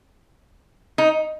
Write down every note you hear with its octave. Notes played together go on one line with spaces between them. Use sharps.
D#4